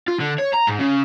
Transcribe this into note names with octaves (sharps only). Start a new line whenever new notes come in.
F4
D3
C#5
A#5
G#2
C#3